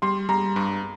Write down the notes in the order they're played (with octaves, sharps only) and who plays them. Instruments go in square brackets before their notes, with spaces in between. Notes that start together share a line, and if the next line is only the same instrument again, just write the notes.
[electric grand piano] G3 [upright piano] C6
[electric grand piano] G3 [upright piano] A#5
[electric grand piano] G2